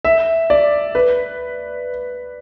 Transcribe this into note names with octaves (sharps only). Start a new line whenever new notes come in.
E5
D5
B4